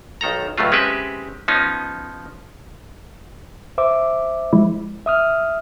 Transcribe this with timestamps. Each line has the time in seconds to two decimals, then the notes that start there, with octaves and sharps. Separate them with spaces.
0.21 B1 D#3 A4 A#5
0.58 C#2 A2 F#3 A3 F4
0.72 G#3 C4 C#4 G4 B4 E5
1.48 F3 B3 C#4 D#4
3.78 C5 E5 D6
4.53 F3 G#3 E4
5.06 E5 D#6 F6